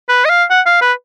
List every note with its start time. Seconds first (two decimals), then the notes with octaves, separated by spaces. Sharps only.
0.09 B4
0.25 D#5
0.30 F5
0.50 F#5
0.66 F5
0.82 B4